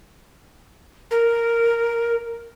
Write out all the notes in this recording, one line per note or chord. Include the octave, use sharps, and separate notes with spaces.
A#4